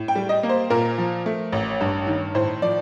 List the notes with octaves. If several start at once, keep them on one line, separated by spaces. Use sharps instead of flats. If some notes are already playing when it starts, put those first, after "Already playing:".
Already playing: A2
G5
G3
D#5
A#3
C5
A#2 A#4
F3
A3
A1
G2
D#3
A2 C5
F3 D5